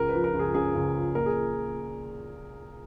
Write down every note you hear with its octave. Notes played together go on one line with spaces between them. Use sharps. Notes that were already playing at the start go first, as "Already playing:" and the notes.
Already playing: C#2 A#4
B4
F3
A#4
C#2
G#4
C#3 G#4
C#2
F3
A#2 A#4
G#4